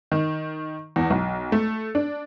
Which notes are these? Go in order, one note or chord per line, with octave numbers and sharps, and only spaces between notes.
D#3
E2
B1
A3
D4